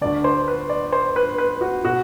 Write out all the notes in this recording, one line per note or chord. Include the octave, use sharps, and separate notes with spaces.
D2 D3 D5
C5
B4
D5
C5
B4
B4
F#4
B2 F#4